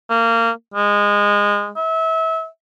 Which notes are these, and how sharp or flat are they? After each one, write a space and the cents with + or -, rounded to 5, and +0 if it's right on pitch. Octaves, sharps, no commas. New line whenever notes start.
A#3 -25
G#3 -20
E5 -30